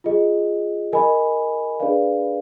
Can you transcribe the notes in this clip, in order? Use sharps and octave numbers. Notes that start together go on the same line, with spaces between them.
F4 G#4 D#5
A#4 D#5 G#5 B5
D4 G#4 B4 D5 F5